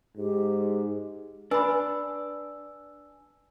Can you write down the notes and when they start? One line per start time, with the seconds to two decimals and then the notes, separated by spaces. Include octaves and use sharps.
0.17 G#2 G4
1.51 D4 B4 G#5 B5 E6